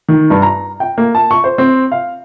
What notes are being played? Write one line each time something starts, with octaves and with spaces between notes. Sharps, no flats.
D#3
G2
A#5
G5
A#3
A5
C#6
C5
C4
F5